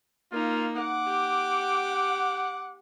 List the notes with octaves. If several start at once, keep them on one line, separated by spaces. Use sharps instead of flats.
A#3 D#4 F4
F#5 D6
G4